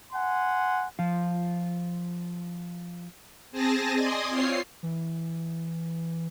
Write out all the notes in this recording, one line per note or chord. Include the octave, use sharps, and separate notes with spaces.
F#5 G#5 C6
F3 F4
C4 G#4 G#5 A5 A#6
D5 D#5 G#5 C6 D#6
C4 F4 C#5 C7
E3